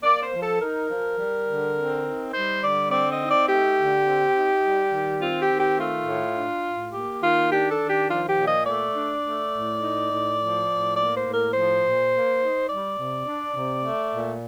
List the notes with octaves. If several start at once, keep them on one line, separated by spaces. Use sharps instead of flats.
A#3 D5
C5
F3
A4
D#4 A#4
F3
G3
D3
C4
D#4
G3 C5
D3 D5
C4 D5
D#5
D#4
D5
A3 G4
D3
C4
D#4
G3
D#3
C4 F4
G4
D#3
G4
A3 F4
A2
D4
A2
A#3 G4
D#3 F4
D4 G4
A4
D#3
G4
F3 F4
G4
A#2
D#5
A3 D5
D4
A3
A2
D#4
A2
F3
A2
A#3 D5
C5
A2
A#4
F3 C5
A#2
A#3
D#4
G3 D5
C3
D4
C3
A3
A#2